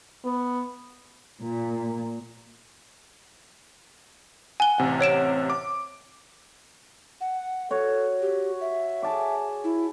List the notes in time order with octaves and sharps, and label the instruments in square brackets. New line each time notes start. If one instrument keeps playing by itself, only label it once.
[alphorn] B3
[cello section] A#2
[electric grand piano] F#5 [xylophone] G#5 G7
[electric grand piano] A1 C3 F#5
[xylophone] C#5 D7 E7
[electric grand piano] D6
[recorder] F#5
[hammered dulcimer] F#4 C#5 [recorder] A4
[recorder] G4
E5
[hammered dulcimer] G#4 A5 D6
[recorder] E4